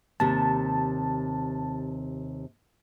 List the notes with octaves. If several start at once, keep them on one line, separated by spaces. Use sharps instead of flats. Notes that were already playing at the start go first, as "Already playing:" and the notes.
D#2 C3 A5